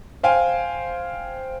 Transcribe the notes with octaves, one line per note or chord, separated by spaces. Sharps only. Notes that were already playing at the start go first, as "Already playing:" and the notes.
C5 F5 G5 G#5